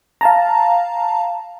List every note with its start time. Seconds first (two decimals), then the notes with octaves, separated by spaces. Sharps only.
0.21 F5 A5 A#5